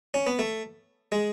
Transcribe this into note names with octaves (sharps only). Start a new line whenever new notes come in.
C#4
B3
A3
G#3